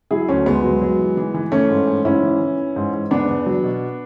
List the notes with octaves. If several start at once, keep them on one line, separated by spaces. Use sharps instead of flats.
F#3 E4 G#4
D2 A3 C#4
D2 G#3 B3
F#3
F#3
E3
E3
E3
E3 A3 C#4
G#2
G#2
G#2 C#4 E4
E3
E3
E3
G#2
G#2
E2 B3 D4
E2
F#3
B2